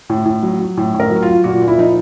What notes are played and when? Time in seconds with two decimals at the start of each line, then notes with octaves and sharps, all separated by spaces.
0.09 A2
0.25 A2
0.43 F#3
0.59 F#3
0.77 A2
0.94 A2
1.00 A#4
1.10 F#3
1.23 F#3 F4
1.44 A#2 F#4
1.62 A#2
1.68 E4
1.78 F3 D#4